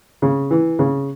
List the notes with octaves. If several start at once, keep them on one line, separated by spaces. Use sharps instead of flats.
C#3
E3
C#3